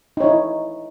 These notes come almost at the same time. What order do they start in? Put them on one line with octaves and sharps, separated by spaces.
D#4 C#5 E4